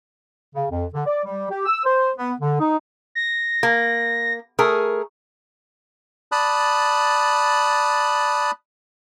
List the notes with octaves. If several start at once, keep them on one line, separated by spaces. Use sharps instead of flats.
C#3
F2
D3
D5
G3
G4
E6
C5
B3
D3
D#4
A#6
A#3
A3 G#4 A#4
D5 A5 B5 D#6 F#6